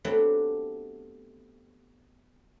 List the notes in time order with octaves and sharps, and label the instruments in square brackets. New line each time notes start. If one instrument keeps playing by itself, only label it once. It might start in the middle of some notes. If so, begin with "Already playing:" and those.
[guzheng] F#3 A3 B3 C4 D4 G4